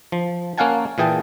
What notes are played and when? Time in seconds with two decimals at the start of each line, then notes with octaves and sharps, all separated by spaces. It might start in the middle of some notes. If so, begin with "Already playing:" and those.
0.12 F3
0.58 A#3 C#4 F5 F#5 G#5 A5
0.98 A#2 E3 G#4 G5 A5